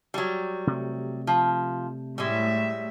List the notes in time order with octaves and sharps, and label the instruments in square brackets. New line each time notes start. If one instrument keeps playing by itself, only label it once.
[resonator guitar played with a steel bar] F#3 G3
[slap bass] C3 A3
[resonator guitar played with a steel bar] F3
[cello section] A2 E5 [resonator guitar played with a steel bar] G3 G#3